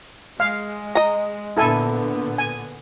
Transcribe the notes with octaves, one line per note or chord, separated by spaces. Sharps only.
G#3 F5
D#5 A#5
A#2 D3 B3 E4 A4 G#5
G#5